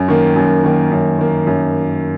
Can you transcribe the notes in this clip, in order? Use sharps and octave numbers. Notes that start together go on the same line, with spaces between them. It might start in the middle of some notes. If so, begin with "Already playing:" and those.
Already playing: F#2
D#3 A#3
F#2
D#3 A#3
F#2
D#3 A#3
F#2